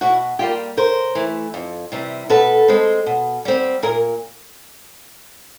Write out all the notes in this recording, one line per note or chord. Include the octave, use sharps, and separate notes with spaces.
B2 E4 F#4
G3 A#3 F4 G4
C#3 A#4 C5
E3 A3
F2
C3 E3 G3
B2 A4 B4
G#3 C4
B2
G3 C4
A#2 G#4 A#4